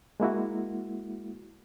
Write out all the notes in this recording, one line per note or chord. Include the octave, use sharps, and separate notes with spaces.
G#3 A#3 E4 F#4